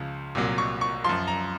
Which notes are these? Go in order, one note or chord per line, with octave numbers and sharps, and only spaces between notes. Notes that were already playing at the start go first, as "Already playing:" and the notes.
Already playing: C#2 C#3 F3
C2 A#2 F#3
C#6
C#6
F#2 F3 C6
A#5